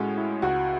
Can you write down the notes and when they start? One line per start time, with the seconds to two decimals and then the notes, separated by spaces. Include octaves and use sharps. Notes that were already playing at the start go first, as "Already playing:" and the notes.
Already playing: A2 G#3 C#4 F#4
0.18 E4
0.42 C#2 F#4